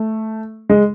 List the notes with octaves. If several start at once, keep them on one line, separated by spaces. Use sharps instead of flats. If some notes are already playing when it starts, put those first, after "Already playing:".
Already playing: A3
G#3